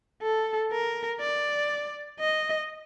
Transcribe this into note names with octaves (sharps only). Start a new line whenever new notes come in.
A4
A#4
D5
D#5